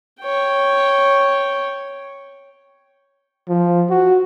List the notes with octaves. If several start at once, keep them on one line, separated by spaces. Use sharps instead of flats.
C#5 G5
F3
F#4